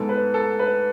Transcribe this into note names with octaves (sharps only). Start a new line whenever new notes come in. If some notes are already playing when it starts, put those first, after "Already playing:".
Already playing: G#2 G#3 B3 A4
B4
A4
B4